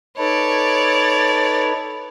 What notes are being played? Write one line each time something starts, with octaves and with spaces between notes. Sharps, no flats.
D#4 A4 B4 C#5 D5